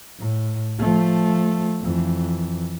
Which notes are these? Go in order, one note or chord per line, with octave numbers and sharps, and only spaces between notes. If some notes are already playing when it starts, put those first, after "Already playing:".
A2
F3 A3
F2 E3